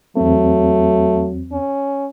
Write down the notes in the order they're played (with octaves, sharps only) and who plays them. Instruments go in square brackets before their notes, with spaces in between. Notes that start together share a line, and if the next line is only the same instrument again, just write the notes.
[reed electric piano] E2 C4 [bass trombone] F#3 [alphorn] A3
[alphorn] C#4